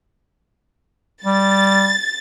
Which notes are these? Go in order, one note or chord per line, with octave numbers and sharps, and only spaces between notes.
G3 A6